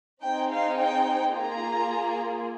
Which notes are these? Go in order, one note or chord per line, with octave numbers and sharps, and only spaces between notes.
C4 D#4 G#4 G5
F5
G5
A#3 F4 G#4 A#5